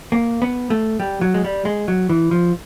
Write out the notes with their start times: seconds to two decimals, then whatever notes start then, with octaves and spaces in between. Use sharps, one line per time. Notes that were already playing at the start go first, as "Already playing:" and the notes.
0.12 A#3
0.42 B3
0.70 A3
1.00 G3
1.21 F#3
1.34 G#3
1.45 G3
1.65 G#3
1.88 F#3
2.10 E3
2.31 F3